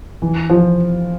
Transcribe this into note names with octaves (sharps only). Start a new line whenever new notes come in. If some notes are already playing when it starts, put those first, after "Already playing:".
E3
F3